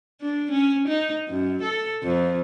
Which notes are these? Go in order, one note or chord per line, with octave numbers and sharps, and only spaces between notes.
D4
C#4
D#4
F#2
A4
F2